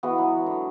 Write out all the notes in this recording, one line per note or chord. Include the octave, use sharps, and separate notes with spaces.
E3 G#3 B3 F#4
F#3
D3